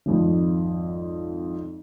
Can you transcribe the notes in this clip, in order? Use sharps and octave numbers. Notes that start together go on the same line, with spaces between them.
G#1 F2